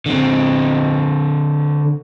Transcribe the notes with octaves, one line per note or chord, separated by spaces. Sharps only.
D3 C4